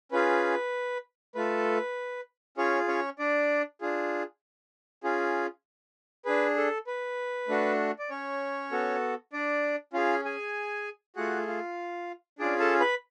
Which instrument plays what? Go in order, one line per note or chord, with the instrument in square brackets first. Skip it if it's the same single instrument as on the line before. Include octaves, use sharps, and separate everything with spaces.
[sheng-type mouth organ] C#4 F4 G#4 B4
A3 F4 A4 B4
C#4 F4 G#4 C#5
C#4 C#5
D4 D5
D4 F4 G#4
C#4 F4 G#4
D4 G#4 B4
A4
B4
A3 D4 F#4
D5
C#4 C#5
B3 F#4 A4
D4 D5
C#4 F4 G#4 F5
G#4 G#5
A3 F4 F#4 G#4 F#5
F4 F5
C#4 D4 F4 G#4 D5
A4 A5
B4 B5